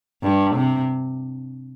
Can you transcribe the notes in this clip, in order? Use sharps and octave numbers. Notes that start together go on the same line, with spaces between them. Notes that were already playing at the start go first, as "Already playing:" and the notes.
G2
C3